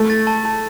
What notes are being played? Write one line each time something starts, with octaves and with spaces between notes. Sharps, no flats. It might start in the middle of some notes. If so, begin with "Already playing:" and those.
Already playing: A3
A6
A5
A5